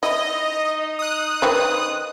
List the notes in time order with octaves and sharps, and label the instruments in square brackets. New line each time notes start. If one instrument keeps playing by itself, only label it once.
[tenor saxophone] D#4 [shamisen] E4 [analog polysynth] D#5
[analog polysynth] D#6 F#6
[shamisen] D#3 C4 B4